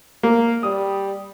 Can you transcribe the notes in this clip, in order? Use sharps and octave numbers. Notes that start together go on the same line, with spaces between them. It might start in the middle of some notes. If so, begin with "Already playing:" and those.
A#3
G3 D#6